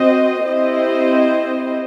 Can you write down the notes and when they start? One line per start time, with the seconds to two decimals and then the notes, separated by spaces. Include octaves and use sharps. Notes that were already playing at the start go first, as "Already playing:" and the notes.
Already playing: C4 F#4 C5 D#5
0.44 C4 E4 G4 C5 D#5